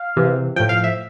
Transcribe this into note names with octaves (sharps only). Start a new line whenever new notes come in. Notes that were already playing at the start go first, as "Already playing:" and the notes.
Already playing: F5
C3 E3
A2 F3 G5
F5
E5